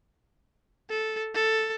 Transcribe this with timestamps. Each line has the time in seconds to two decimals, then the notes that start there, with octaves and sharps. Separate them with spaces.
0.90 A4
1.34 A4